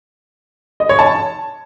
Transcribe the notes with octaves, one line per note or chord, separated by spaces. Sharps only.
D#5
C#5
A5